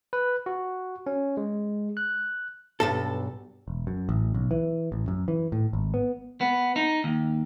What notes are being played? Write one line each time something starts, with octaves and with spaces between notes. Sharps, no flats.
B4
F#4
C#4
G#3
F#6
B1 G2 A4
E1
F#2
A1
B1
E3
A1
F#2
E3
A2
G#1
B3
B3
D#4
D#2